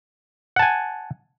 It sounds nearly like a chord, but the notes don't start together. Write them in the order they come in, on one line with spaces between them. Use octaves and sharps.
F#5 A5 G#5